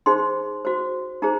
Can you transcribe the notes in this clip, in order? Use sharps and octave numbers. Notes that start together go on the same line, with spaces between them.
D#4 G#4 C5 C6
F#4 C5
D#4 G#4 C5 A#5